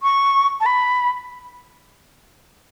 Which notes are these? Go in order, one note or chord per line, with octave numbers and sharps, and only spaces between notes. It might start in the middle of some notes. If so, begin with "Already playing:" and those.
C#6
A5
B5